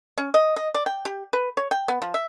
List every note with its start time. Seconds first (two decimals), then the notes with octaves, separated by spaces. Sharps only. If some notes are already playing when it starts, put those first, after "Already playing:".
0.18 C#4
0.34 D#5
0.56 D#5
0.74 D5
0.86 G5
1.05 G4
1.33 B4
1.57 C#5
1.71 G5
1.88 B3
2.02 F3
2.14 E5